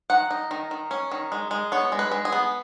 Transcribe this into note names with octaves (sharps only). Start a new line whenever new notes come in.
D#3 F#5
D#4
D#3
D#3
C#4
D#3
G#3
G#3
B3 C#5
G#3
B4
G#3
G#4
B3